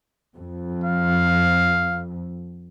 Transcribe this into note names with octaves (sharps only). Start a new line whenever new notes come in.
F2
F5